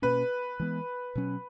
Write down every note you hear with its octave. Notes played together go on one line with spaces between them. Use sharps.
B2 A#3 C#4 B4
E3 G#3 B3
B2 F#3 C#4